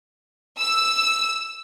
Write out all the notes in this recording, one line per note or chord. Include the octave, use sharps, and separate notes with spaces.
E6